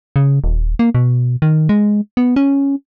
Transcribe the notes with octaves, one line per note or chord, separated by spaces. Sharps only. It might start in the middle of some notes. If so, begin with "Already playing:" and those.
C#3
D#1
A#3
B2
D#3
G#3
B3
C#4